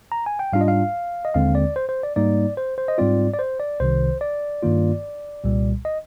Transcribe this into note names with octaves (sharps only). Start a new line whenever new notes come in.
A#5
G#5
G5
G#2 G3 D4 F4 F5
D#5
F5
D#5
D#2 D3 G#3 C4 F5
D5
C5
C5
D5
G#2 G3 A#3 D#4 D5
C5
C5
D#5
G#2 G3 C4 F4 D5
D5
C5
D5
C2 C3 D#3 C5
D5
G2 D#3 A#3 F4
C2 A#2 G3
D#5